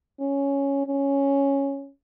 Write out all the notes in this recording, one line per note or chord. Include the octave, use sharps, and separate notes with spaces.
C#4
C#4